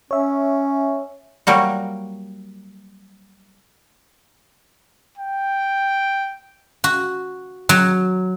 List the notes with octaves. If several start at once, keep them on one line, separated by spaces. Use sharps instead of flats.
C#4 C#5 E5
F#3 G3 A#3 F#4
G5
F#4
F#3